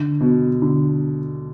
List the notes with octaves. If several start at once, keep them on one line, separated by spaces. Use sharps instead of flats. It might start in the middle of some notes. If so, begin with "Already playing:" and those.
Already playing: D3
B2
D3